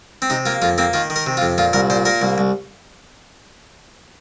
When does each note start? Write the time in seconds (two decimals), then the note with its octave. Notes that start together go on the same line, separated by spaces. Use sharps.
0.22 C4
0.30 C3 D#4
0.46 A#3 F4
0.62 F2 F4
0.78 A#3 C4
0.93 D#3 F4
1.10 D#3
1.16 A#4
1.26 C3
1.37 F4
1.42 F2
1.58 A#2 F4
1.73 C2 A#4
1.90 A#2 C5
2.05 A#3 A#4
2.22 C2
2.38 C2